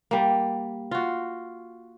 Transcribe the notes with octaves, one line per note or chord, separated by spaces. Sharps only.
G3 A#3
F4 F#4